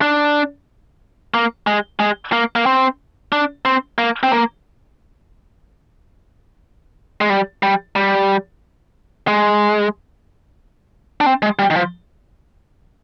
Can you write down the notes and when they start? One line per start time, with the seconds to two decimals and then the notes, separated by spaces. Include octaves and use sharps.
0.02 D4
1.34 A#3
1.67 G#3
2.00 G#3
2.33 A#3
2.56 A#3
2.66 C4
3.32 D4
3.65 C4
3.98 A#3
4.23 C4
4.32 A#3
7.21 G#3
7.30 G3
7.63 G3
7.96 G3
9.28 G#3
11.21 D4
11.26 C4
11.42 G#3
11.59 G3
11.70 D#3
11.76 F3